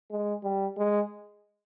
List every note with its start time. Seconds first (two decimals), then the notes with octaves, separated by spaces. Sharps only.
0.11 G#3
0.43 G3
0.77 G#3